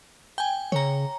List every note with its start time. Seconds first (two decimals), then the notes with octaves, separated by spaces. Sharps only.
0.38 G5 G#5
0.72 C#3 C#5 A#5